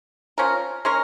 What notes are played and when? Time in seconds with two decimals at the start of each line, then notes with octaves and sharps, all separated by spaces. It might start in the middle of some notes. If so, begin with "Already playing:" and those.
0.38 F3 C#4 A#4
0.85 G#3 C#4 A#4